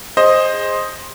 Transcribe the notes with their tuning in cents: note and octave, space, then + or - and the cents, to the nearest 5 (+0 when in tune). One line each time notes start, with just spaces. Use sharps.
G#4 -25 C5 +10 D#5 +0